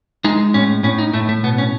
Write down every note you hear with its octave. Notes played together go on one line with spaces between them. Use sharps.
G#3 D#4
A2 C#4
A2 C#4
D#4
A2 A3
A3
B2 B3
C#4